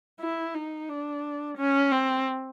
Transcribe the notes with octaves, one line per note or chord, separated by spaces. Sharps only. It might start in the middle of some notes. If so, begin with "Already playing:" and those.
E4
D#4
D4
C#4
C4